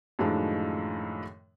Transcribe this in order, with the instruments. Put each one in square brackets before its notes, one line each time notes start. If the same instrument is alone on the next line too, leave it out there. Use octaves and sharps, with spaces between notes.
[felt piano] F#2 A2 D#3 F3 G#3 D4